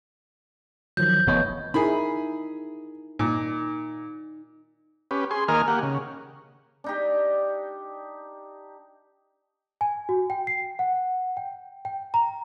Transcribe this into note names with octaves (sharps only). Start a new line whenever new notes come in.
D#3 F3 F#3 G6
F1 F3 B3 B4 C#5 D#5
D#4 E4 G#4 A#4 B5
A#2 D#4
C#4 G4 B4
G#4 C6
D#3 A#3 A#4 D#5 G#5 F6
A#3 G4 F#5
C#3
D4 D#4 G4
G#5
F#4
G5
C7
F#5
G5
G5
A#5